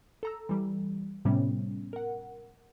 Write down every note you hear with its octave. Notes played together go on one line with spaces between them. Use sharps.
A4 A#5 E6
E3 G3
A2 C3 G3 B3 C#4
A#4 F#5